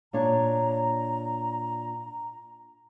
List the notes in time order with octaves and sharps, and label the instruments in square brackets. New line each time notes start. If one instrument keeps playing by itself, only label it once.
[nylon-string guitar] A#2 D4 C#5 [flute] A#5